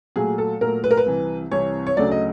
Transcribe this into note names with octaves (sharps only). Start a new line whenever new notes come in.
A#2 F#3 A3 G#4
A4
A#2 F#3 A3 A#4
B4
A#4
B4
C2 C3 E3
C2 C3 E3 C#5
C#5
D2 C#3 F#3 A3 D5
D#5